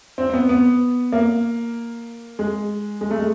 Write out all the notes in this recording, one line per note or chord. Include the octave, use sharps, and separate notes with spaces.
C4
C4
B3
B3
A#3
G#3
G#3
A3
G#3